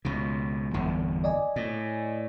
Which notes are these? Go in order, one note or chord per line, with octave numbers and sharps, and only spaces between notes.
C#2 B2
G1 E2 D3
D5 D#5 G#5
A2